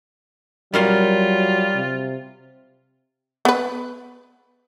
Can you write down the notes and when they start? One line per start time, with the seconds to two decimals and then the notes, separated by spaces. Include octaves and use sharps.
0.74 F#3 G3 F4 A#4 C6
1.75 C3
3.45 B3 B4